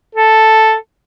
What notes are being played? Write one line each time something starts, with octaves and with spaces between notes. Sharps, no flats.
A4